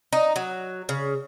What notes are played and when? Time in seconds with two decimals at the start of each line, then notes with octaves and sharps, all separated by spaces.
0.13 D#4
0.36 F#3
0.89 C#3